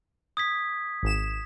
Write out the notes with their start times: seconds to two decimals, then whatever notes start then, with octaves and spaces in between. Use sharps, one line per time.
0.37 D#6 G#6 B6
1.03 G#1 E7